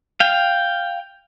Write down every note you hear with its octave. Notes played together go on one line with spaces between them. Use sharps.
F5 G5